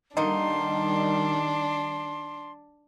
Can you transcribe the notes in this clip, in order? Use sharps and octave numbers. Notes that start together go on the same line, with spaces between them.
D3 D#3 G3 A#3 D4 D#4 C6